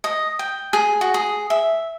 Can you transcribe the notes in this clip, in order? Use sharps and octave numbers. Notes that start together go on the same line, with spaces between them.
D#5
G5
G#4
F#4
G#4
E5